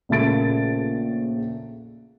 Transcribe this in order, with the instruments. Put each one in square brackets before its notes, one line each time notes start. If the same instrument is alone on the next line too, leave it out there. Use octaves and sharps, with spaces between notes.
[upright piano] A#1 C#3 A3 A#3 A6 D7